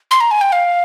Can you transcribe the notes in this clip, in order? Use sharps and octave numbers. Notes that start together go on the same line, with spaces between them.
C6
A#5
G#5
G5
F5